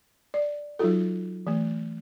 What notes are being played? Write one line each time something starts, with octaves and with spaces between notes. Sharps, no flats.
D5
F#3 D#4 F4 F#4 A4
E3 A3